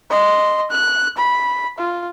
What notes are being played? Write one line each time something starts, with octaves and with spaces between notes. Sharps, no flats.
D#5 C6
F#6
B5
F4